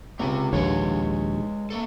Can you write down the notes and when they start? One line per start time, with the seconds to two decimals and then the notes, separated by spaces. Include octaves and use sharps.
0.19 C#2 C4 G4
0.53 A#1 D#2 G#3 B4 C#5 F#5
1.70 A#3 B3 A4